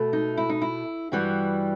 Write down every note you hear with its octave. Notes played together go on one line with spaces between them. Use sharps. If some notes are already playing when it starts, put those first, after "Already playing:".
Already playing: B2 A3
D#4
E4
D#4
E4
G2 E3 G3 F#4